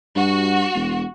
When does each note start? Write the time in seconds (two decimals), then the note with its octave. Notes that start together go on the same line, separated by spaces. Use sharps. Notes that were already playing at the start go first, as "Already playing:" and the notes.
0.16 G2 F#4
0.75 E1